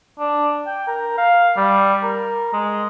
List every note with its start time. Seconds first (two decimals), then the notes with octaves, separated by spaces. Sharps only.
0.20 D4
0.67 G5
0.87 A#4
1.18 F5
1.57 G3
2.03 A#4
2.53 G#3